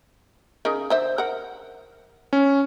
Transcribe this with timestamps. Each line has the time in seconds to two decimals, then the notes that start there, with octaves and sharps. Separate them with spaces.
0.65 C#3 D#4 A#4
0.90 D3 C5 E5
1.18 A#4 F#5
2.33 C#4